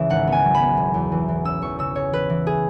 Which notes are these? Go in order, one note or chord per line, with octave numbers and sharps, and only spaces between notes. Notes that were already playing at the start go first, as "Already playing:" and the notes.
Already playing: C#2 C#3 E3 E5
G#1 F#5
B3 G#5
F#3
B5
B3
E1
E2
E3
E3
C#4 E6
E2 C#6
C#3 E6
C#3 C#5
E3 B4
E3
G#4